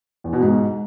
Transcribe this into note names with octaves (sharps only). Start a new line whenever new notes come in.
E2
B2
G#2